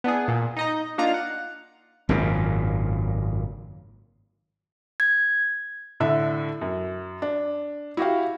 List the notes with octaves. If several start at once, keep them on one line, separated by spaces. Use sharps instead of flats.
B3 D4 E4 G#4
A#2
D#4 D#5 A#5
A#3 D4 D#4 F4 F5 A#5
F#5
G#1 F#2 A#2 C#3
G#6
A2 D3 E5
F#2
D4
E4 F#4 G4 F5